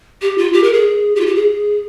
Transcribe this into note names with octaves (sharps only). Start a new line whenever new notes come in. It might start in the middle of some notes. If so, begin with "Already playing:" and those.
G4
F4
G4
A#4
G#4
G4
F4
G4
G#4